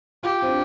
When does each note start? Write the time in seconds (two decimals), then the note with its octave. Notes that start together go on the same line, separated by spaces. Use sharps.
0.23 F4 G4
0.42 C4
0.48 D4